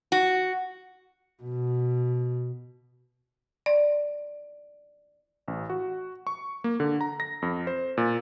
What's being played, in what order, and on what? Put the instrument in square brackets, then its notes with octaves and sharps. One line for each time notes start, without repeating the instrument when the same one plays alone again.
[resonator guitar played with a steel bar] F#4
[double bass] B2
[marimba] D5
[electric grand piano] A1
F#4
C#6
A#3
D3
A#5
A#6
F2
C5
A#2